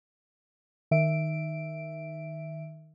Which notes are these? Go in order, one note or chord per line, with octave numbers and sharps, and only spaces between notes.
D#3 E5 D7